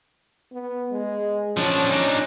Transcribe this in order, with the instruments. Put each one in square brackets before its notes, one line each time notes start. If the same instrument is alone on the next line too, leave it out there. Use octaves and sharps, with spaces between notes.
[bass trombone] B3
G#3
[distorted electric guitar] F3 D4 [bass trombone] C#4
[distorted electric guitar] D4 D#4